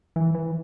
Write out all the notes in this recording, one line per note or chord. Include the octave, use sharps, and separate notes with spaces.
E3
E3